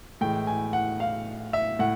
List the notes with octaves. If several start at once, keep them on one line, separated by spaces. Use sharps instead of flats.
A2 E3 G#3 G5
G#5
F#5
F5
E5
A2 F#5